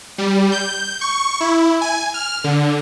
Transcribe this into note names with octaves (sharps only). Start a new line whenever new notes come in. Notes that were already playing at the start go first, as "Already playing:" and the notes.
G3
G6
C#6
E4
G#5
F6
D3